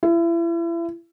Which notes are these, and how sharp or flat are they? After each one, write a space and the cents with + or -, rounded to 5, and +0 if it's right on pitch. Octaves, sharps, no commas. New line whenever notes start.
E4 +35